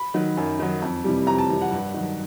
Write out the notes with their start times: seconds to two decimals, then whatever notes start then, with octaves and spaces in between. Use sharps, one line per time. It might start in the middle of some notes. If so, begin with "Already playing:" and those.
Already playing: B5
0.14 D#3 F#3
0.37 F#2
0.59 D#3 F#3
0.82 F2
1.05 C3 E3 G3
1.27 F2 A#5
1.38 A5
1.49 C3 E3 G3
1.62 F#5
1.72 G2
1.94 D#3 F#3